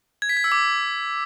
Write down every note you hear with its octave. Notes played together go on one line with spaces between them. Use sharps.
G#6
B6
G#6
E6
D6